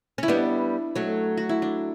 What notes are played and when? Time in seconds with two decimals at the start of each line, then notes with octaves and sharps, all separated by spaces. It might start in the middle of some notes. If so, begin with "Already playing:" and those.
0.18 C#4 E4
0.28 G3 B3 D4
0.96 F#3 A3
1.38 F#4
1.49 E4
1.62 D4